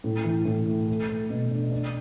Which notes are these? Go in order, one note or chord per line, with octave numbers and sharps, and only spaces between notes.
A2
E3
A2
A3
A4
A3
B2
D4
D4